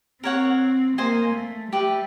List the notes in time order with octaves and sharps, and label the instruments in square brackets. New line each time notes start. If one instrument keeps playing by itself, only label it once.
[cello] C4 [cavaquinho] A#4 C#5 F#5
[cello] A#3 [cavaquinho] C5 D#5 G#5
[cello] A3
[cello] G3 [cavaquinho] G4 B4 E5